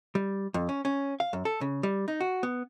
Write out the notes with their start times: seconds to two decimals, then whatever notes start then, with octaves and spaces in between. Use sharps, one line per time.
0.15 G3
0.54 F2
0.69 C#4
0.85 C#4
1.20 F5
1.33 F#2
1.45 A4
1.61 C#3
1.83 G3
2.08 D#4
2.21 F#4
2.43 B3